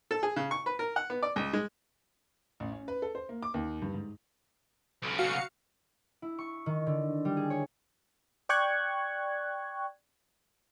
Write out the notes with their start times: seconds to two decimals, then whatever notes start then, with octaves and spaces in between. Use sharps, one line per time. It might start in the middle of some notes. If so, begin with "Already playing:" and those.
0.11 A4
0.23 G#4
0.36 C#3
0.51 C#6
0.66 B4
0.79 A#4
0.96 F#5
1.10 B3
1.23 D5
1.36 C#2
1.53 G#3
2.60 A1
2.72 C#4
2.88 B4
3.02 A4
3.15 C5
3.29 A#3
3.43 D6
3.54 D#2
3.82 G2
3.94 G#2
5.02 B1 C#3
5.18 F#4 F5 C#7
6.22 E4
6.39 C#6
6.66 D#3
6.87 D3
7.25 G3
7.37 G#4
7.50 C#5
8.49 D5 G5 C#6 F#6 G#6